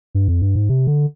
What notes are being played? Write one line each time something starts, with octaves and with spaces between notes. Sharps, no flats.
G2
F2
G2
G#2
C3
D3